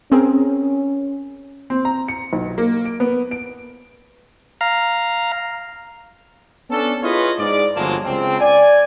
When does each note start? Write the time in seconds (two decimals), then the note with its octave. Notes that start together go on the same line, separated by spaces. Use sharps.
0.12 C4 C#4 G#4 A#4
1.70 C4
1.85 A#5
2.08 C#7
2.33 B1
2.58 A#3
2.85 D7
3.00 B3
3.31 D7
4.61 F5 A#5
6.70 B3 C#4 D4 A4
7.03 E4 F4 G#4 B4 C#5 D#5
7.38 G#2 D5
7.76 G1 F3 F#3 G#3 A#3 A5
8.05 C#2 C4
8.40 D5 G#5